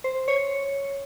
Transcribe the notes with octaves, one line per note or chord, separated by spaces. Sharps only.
C5
C#5